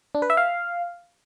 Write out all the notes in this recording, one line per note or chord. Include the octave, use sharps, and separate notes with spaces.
D4
B4
E5
F5